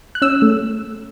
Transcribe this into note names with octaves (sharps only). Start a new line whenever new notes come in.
F#6
C#4 E6
A3